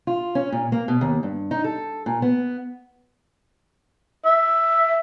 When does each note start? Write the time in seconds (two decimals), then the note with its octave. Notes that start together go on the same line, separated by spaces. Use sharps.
0.07 F4
0.35 C#4
0.52 A#2
0.72 A#3
0.88 B2
1.01 D#2
1.23 G2
1.51 D#4
1.64 A4
2.06 A#2
2.22 B3
4.25 E5